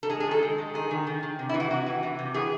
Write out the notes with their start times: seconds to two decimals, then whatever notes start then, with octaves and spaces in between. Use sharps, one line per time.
0.03 A4
0.10 G#3 G#4
0.20 G#4
0.27 D#3 A4
0.43 G#3
0.58 G#3
0.74 D#3 G#4
0.91 D#3
1.07 D#3
1.23 D#3
1.39 C3
1.49 E4
1.54 E3
1.60 F#4
1.70 C3 F#4
1.86 E3
2.03 E3
2.19 C3
2.34 E3 G#4